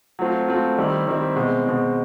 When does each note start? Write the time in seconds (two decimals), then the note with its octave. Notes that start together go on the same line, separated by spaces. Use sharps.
0.19 F#3 A3 C4 F4
0.48 F#3 A3 C4 F4
0.78 D#3 G3 C4 E4
1.07 D#3 G3 C4 E4
1.36 B2 G#3 C4
1.65 B2 G#3 C4